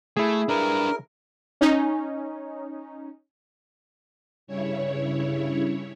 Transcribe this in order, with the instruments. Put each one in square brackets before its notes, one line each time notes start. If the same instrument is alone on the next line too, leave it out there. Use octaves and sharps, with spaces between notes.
[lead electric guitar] A3 [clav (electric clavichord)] E4 G#4
[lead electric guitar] D4 B4 [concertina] A#4
[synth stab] C#4 D#4
[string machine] G2 C#3 E4 C#5